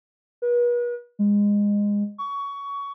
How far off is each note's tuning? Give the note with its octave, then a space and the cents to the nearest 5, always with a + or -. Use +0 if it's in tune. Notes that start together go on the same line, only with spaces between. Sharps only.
B4 -40
G#3 -20
C#6 +20